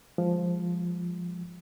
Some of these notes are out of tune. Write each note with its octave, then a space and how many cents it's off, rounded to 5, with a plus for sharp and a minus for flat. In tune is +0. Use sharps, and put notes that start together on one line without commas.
F3 +0 G#3 -20